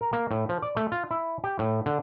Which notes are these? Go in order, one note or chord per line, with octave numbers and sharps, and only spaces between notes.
A#4
A#3
A2
F3
D5
A3
F4
E4
G4
A2
D3